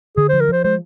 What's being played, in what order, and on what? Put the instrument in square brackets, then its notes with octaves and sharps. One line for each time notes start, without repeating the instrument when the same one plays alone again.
[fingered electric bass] D3 [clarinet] G#4
[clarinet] C5
[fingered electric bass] F3
[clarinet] A#4
[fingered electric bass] F3 [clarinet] C5
[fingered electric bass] G#3 [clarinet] C5